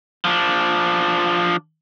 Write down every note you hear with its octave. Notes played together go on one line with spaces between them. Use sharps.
F3 D4